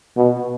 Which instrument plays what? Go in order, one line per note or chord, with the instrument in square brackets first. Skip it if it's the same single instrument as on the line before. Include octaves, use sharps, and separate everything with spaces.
[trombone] B2